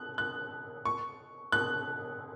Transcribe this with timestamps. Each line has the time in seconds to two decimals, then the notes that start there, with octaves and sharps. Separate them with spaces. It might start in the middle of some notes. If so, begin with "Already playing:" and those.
Already playing: F#6
0.18 F#6
0.85 C#6
1.52 F#6